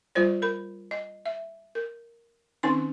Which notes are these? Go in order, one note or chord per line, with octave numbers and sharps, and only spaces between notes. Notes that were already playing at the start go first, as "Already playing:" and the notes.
G3 F4 C5 D5
A#4 B5
D#5
E5
A#4
D#3 C4 C#4 D#4 C6